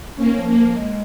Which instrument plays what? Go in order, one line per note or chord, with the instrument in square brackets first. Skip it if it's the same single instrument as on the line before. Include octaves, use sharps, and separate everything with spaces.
[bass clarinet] G#2 [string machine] A#3 C#4
[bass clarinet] F3
[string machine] A#3
[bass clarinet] F3
G#3